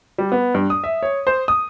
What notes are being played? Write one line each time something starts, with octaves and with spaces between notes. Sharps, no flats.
G3
B3
G2
D#6
E5
C#5
C5
D#6